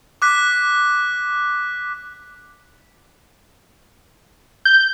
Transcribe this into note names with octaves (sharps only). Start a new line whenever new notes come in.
D6 F#6 B6
G6